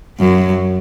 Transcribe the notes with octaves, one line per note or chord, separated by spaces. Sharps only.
F#2